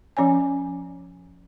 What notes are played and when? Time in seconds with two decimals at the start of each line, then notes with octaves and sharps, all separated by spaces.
0.17 F3 C#4 C#5 G#5